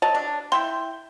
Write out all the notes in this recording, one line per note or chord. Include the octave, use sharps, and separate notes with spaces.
F#3 D#5 A5
D4
E4 E5 G5 C6